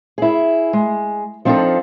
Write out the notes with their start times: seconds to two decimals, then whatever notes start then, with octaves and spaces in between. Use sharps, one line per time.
0.18 E4 G#4
0.73 G#3
1.45 F3 C4 D4 D#4 F4 A4